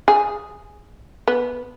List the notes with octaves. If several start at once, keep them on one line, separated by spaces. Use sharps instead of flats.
G#4
B3